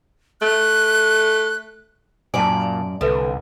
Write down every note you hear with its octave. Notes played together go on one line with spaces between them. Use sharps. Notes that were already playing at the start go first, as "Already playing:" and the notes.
A3 F#6
F#2 A#2 D5 G#5 A5
C2 D3 A4 B4 E5